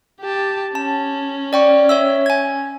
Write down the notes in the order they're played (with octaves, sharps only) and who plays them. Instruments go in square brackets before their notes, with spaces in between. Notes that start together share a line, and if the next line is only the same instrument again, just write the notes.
[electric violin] G4 A5
[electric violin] C#4 [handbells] A5
[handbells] D5 G5 C#6
C#5 E5 E6
G#5 G#6